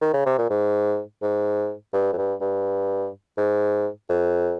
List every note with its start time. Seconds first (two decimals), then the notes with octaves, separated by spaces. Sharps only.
0.01 D#3
0.13 C#3
0.26 C3
0.38 A#2
0.50 G#2
1.22 G#2
1.93 G2
2.13 F2
2.18 G2
2.41 G2
3.37 G#2
4.09 F2